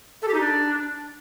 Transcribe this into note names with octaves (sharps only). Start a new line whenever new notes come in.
A4
G4
D#4
D4